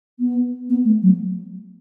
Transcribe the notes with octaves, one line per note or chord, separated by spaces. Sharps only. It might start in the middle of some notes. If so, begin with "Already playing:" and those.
B3
B3
A3
F#3